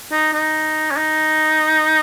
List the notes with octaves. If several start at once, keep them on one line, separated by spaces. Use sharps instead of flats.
D#4
D#4
C#4
D#4